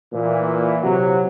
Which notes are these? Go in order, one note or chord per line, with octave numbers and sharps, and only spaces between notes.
A#2 E3
C3 F#3